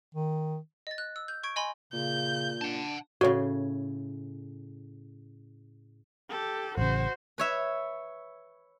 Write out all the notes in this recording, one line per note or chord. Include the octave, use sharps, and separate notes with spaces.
D#3
D#5 A6
F#6
E6
G6
C#6 G#6 D7
D#5 G#5 B5 C6
A#2 C#3 G6
D4 F#5 A5
A2 C#3 F#4 C#5
G4 A4
A1 C#3 F#4 C5
B4 C#5 E5